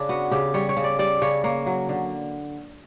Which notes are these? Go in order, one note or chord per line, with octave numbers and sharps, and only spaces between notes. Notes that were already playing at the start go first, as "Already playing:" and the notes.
Already playing: C#3 D4
B3 F#4
C#3 G4
G3 C#5
C#5
C#3
D5
G3 D5
C#3 C#5
A#3 C#5
F#3
D3